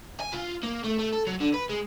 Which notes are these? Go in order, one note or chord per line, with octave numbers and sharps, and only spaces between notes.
G#5
F4
A#3
A3
A3
A4
F#3
D3
B4
G#3